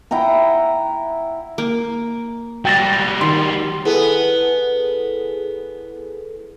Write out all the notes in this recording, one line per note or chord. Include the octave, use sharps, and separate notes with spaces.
E4 F#5 G5 A#5
A#3
F#3 G3 G5 A6 A#6
D#3 C6
B3 E4 G#4 A4